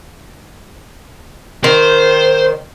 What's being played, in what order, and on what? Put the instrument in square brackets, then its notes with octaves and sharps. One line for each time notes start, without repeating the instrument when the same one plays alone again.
[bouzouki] D#3 [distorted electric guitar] C5